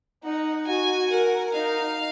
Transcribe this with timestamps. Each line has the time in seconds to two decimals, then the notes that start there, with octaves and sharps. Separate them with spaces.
0.24 D#4 F#5
0.67 F#4 G#5
1.10 A#4 F#5
1.54 D#4 F5